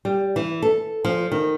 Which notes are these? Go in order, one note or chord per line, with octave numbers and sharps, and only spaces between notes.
G3
E3
A4
F3
D#3